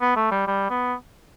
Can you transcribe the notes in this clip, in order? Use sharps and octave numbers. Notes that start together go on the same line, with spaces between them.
B3
A3
G3
G3
B3